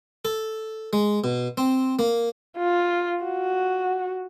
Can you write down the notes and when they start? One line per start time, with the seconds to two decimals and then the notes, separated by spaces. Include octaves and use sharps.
0.25 A4
0.93 G#3
1.24 B2
1.58 C4
1.99 A#3
2.58 F4
3.24 F#4